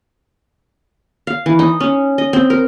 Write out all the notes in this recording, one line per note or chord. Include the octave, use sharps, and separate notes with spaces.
F5
E3
D#4
C#4
D#5
C4
A#4